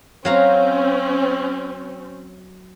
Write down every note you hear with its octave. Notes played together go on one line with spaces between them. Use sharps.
F#3 C4 C#4 F5 A#5